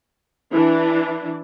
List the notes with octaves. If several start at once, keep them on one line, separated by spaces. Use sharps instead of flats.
E3 D4 E4